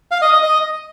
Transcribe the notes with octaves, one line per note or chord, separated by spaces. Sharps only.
F5
D#5
D#5
D#5